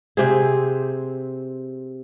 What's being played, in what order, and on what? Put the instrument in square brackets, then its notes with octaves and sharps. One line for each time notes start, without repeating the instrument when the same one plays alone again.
[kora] C3 C4 G#4